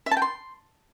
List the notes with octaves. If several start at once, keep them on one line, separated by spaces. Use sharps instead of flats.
E5
A5
G5
C6